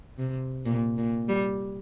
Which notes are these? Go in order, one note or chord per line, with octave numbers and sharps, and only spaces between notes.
C3
A#2
A#2
G3